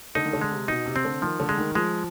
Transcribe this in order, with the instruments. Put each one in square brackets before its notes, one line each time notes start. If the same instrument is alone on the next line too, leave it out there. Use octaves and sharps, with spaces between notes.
[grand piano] D3 [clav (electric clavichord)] D#4
[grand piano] D#3
D3
[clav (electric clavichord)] G#3
[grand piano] C3
[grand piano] B2 [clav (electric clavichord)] D#4
[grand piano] C3
[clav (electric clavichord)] C4
[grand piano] D3
[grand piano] D#3 [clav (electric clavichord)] F3
[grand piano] D3
[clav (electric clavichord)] G#3
[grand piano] D#3
[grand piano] F3 [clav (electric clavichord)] G#3